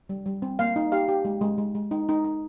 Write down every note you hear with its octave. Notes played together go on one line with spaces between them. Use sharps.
G3
G3
C4
A#3 F5
D#4
G4 F5
G4
G#3
G#3
G#3
G#3
D#4
D#4
D#4